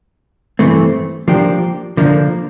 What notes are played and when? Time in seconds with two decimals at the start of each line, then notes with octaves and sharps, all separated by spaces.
0.59 G2 E3 A3 C4
1.28 F3 A#3 D4 G4
1.97 D3 F3 A#3 D4